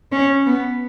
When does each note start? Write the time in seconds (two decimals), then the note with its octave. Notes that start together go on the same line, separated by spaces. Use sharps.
0.12 C#4
0.46 B3